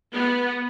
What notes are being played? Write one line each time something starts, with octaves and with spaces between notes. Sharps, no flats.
B3